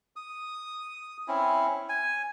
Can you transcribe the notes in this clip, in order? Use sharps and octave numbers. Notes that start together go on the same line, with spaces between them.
D#6
C4 C#4 E4
G#5